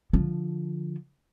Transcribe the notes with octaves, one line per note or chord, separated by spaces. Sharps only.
D3 F3